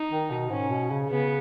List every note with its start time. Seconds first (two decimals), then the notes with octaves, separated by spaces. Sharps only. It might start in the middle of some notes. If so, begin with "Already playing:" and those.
Already playing: D#4
0.11 D#3
0.31 B2
0.50 G#2 C#4
0.70 B2
0.91 C#3
1.10 C#3 B3